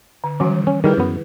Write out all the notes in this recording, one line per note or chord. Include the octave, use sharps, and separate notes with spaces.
D3
D#3 E3 F#3 G3 C#4
C#4
D#3 G3 E4 G#4 B4 G5
F#2 B3